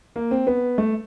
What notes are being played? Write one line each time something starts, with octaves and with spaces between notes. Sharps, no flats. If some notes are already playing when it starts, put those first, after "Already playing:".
A#3
C4
B3
A3